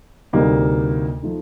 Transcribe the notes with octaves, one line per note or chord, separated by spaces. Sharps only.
D2 C3 G3 A#3 D#4
F3 A3 D#4